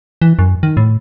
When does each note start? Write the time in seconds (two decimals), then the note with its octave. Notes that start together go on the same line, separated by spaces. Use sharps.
0.22 E3
0.39 F#2
0.63 D#3
0.77 A2